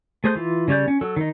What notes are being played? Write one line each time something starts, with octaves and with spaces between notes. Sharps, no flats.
A3 G#4 C5 A#5 G6
E3 F4
C#3 G3 C#5 D5 G6
C#4
F#3 A4
D#3 D#4